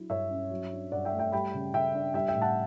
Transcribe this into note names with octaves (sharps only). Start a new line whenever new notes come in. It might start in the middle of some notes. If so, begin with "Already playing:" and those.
Already playing: F#3 D4 E4
G2 C#5 E5
C#4
F#3
D4
G2 D5 F#5
E5 G5
A3
E5 G5
G3 G5 B5
C#3
C#3 E5 G5
D4
G3 E5 G5
E5 G5
A2
F#5 A5